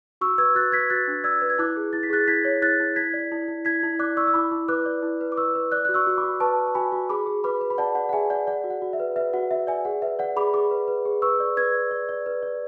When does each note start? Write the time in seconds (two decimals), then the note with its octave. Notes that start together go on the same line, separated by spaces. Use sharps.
0.21 F#4 C#6 E6
0.38 B4 E6 G#6
0.55 F#4 F#6 A6
0.72 B4 G#6 B6
0.90 F#4 F#6 A6
1.07 D4
1.24 D5 E6 G#6
1.42 B4
1.50 G#6
1.59 E4 D6 F#6
1.76 G#4
1.93 E4 A6
2.03 B6
2.10 G#4 F#6 A6
2.28 E4 G#6 B6
2.45 C#5
2.62 E4 F#6 A6
2.80 E4
2.96 E4 G#6 B6
3.14 D5
3.32 E4
3.48 E4
3.65 E4 G#6 B6
3.83 E4
3.99 D5 D6 F#6
4.17 D5 C#6 E6
4.27 E6
4.34 E4 B5 D6
4.51 E4
4.68 B4 D6 F#6
4.86 D5
5.02 E4
5.21 B4
5.32 D6
5.37 B4 C#6 E6
5.55 B4
5.72 D5 D6 F#6
5.85 F#4 F#6
5.94 C#6 E6
6.07 F#4
6.18 B5 D6
6.24 F#4
6.40 B4 A5 C#6
6.58 B4
6.67 A5
6.75 F#4 G#5 B5
6.92 F#4
7.09 G#4 B5 D6
7.27 G#4
7.44 B4 B5 D6
7.61 B4
7.70 B5
7.78 D5 F#5 A5
7.95 D5 F#5
8.09 F#5
8.13 G#4 E5 G#5
8.30 D5 F#5
8.47 D5 F#5
8.64 F#4
8.70 F#5
8.82 F#4
8.93 E5
8.99 B4
9.16 B4 E5
9.33 F#4 F#5
9.51 F#4 E5
9.67 D5 E5 G#5
9.85 G#4 F#5
10.02 B4 E5
10.19 D5 F#5
10.36 G#4 B5 D6
10.54 G#4 B5 D6
10.71 B4
10.88 B4
11.05 G#4
11.22 B4 C#6 E6
11.40 D5
11.57 B4 E6 G#6
11.74 D5
11.91 D5
12.09 D5
12.26 B4
12.43 D5